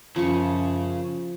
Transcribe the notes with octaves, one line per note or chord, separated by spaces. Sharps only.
F#2 C#3 F3 C#6